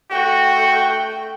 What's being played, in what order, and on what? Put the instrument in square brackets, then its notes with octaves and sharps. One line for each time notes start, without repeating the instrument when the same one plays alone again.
[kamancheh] A3 G5 [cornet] F#4